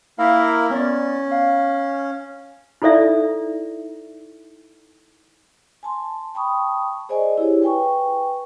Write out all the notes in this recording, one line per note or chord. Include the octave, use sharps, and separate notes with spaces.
A#3 E4 A#4 F5 B6
B3 C#4 D5
F5
D#4 E4 A4 D5 E5
G#5 A5 C6
G5 A5 B5 C#6 D#6
G#4 C5 D5 D#5 G#5
E4 G4 G#4 C#5
B4 G5 G#5 C#6